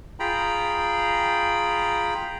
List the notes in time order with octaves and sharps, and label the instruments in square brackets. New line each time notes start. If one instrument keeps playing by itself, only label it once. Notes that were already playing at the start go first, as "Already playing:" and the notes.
[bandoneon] F4 G#4 G5 A#5 B5